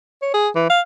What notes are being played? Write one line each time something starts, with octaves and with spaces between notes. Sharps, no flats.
C#5
G#4
E3
F5